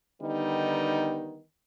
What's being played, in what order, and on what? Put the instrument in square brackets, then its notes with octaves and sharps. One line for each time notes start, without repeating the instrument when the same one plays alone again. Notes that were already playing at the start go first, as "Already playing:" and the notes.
[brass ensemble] D3 D#3 G3 B3 D#4